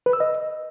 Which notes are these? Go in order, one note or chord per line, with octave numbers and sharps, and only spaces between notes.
B4
E6
D#5